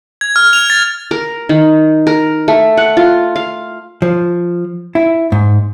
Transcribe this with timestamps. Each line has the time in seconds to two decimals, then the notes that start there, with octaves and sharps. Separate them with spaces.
0.21 G#6
0.36 F6
0.53 F7
0.70 A6
1.11 A#4
1.49 D#3
2.07 A#4
2.48 A3
2.77 F#5
2.97 F4
3.36 F5
4.02 F3
4.95 E4
5.32 G#2